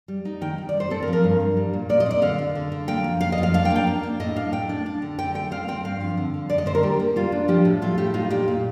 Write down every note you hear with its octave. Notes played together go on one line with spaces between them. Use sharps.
G3
D#4
D#3 G5
D#3
D5
G3
C5
C4 A4
A#4
F3
A#4
G2
G2
G3
A#2
A#2 D5
D#5
C4 D5
D3 F5
D3
D3
D3
A#3 G5
F2
F2 F5
D#5
F2
F5
D4 F5
G5
A#3
G5
D4
D4
A2 D#5
D4 F5
A2 G5
D4
D4
D3
D3 G5
A3 G5
C4 F5
C4 G5
G2 F5
F3
D3
D3
D3 D5
D#5
D3 C5
A#4
G3 G4
A#3
G3 F4
D4
F3 G4
A2
A3 F4
A2 G4
D#4 F4
A#2 G4
A#2